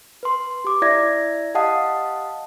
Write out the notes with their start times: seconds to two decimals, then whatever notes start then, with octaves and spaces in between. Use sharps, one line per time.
0.23 B4 C6
0.64 G4 D6
0.82 E4 D5 E5 G#6 A#6
1.54 G4 D#5 F5 F#5 A5 D#6